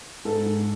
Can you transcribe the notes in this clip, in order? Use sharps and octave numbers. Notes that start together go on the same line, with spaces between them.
G#2 A4
G#2